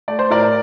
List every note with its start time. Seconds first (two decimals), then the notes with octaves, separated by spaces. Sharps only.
0.08 A3 D5
0.19 C5
0.30 A2 A#4 D5